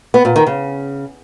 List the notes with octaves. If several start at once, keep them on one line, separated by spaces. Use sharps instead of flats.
B3
A#2
D#3
C#3